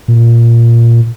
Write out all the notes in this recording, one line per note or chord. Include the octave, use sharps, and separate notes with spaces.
A#2